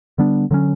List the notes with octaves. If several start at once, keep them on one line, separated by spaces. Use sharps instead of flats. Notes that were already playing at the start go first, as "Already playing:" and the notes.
D3 G3 B3 D4
D3 F#3 A#3 C#4